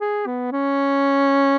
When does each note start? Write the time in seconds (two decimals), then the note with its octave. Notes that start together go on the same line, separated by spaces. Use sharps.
0.01 G#4
0.27 B3
0.52 C#4